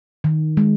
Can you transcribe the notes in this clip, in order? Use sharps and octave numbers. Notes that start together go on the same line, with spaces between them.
D#3
G#3